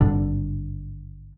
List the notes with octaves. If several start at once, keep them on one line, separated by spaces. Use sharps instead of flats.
G#1 G2 D3